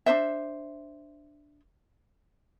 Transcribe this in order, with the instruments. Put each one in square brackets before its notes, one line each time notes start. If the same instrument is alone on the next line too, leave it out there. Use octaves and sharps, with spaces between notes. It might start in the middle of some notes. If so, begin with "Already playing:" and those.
[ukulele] D4 D#4 C5 E5